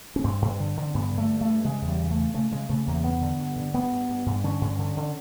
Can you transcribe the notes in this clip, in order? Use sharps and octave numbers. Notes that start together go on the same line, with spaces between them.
C#4
G2 C4
G2
D3
D3
G2 B3
D3
A3
G2
A3
G2
C#3 G#3
E2
G3
C#3
A3
C#3
C#3 A3
C#3 G#3
C#3 A3
E2 A#3
G2 B3
D3
G2
D3
G2 B3
G2
G2
G2
D3 C#4
G2
D3
D3